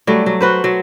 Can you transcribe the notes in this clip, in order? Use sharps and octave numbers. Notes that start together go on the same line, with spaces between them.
F#3 G3 A3
F#3
F#4 B4 C5
F#3